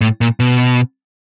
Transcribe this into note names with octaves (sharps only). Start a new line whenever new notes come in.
A2
A#2
B2